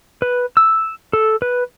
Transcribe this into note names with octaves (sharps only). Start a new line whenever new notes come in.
B4
E6
A4
B4